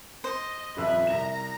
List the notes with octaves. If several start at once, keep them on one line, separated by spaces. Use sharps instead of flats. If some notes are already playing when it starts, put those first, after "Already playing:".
C5 D#5
D#1 F2 B4 E5 E6
C2 A#5 E7